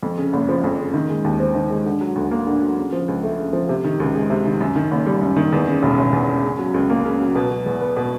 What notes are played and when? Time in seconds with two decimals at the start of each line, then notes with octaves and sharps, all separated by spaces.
0.03 F2
0.18 C#3
0.33 F#1
0.49 F3
0.64 F2
0.79 C#3
0.94 D#3
1.09 G#3
1.24 D#2
1.40 C4
1.55 D#3
1.70 G#3
1.86 D3
2.01 F#3
2.16 D2
2.31 A#3
2.47 D3
2.62 F#3
2.77 C#3
2.92 F3
3.08 C#2
3.23 A3
3.39 C#3
3.53 F3
3.69 C3
3.84 D#3
4.00 C#2
4.15 G#3
4.30 C3
4.46 D#3
4.61 F#2
4.76 D#3
4.91 F#1
5.06 G3
5.21 F#2
5.37 D#3
5.52 E2
5.67 C#3
5.83 E1
5.98 E1
6.13 E2
6.29 C#3
6.44 C#3
6.59 F#3
6.74 C#2
6.90 A#3
7.05 C#3
7.20 F#3
7.36 B2
7.51 F#3
7.66 E2
7.81 B3
7.97 B2